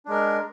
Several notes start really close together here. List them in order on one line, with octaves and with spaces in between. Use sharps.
D4 G#3 A#4